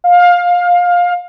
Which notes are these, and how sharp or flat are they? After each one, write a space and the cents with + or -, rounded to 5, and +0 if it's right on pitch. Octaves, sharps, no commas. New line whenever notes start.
F5 +20